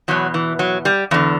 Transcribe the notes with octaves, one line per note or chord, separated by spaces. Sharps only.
E2 B2 F#3
E3
F#3
G3
E2 D3